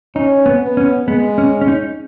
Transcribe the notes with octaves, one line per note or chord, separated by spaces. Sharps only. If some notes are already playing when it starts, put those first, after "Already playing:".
C#4 D#4
B3
B3
C#4
G#3 B3
C#4
C#4
D#4